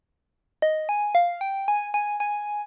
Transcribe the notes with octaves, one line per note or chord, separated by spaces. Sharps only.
D#5
G#5
F5
G5
G#5
G#5
G#5